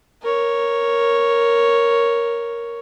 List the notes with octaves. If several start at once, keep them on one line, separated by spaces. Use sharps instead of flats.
A#4 C#5